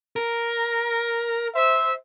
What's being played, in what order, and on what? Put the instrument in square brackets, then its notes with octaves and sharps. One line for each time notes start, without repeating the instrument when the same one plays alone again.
[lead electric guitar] A#4
[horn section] C5 E5